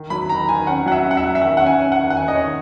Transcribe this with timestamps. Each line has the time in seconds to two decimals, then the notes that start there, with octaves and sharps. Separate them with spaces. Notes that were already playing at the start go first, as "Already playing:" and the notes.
Already playing: D#3
0.10 F#3 B5
0.29 D#3 A#5
0.49 D#3 G#5
0.67 C#4 F#5
0.86 F#3 F#5
0.92 E5
1.04 C#4
1.11 F#5
1.17 E5
1.23 F#3
1.35 E5
1.42 D#3 F#5
1.57 C#4 F#5
1.66 G#5
1.80 C#4
1.92 F#5
1.98 D#3
2.10 F#5
2.17 D#3 G#5
2.28 D#5
2.35 D#3 C#5